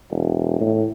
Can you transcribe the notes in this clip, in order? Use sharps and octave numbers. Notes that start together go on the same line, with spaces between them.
E1
A2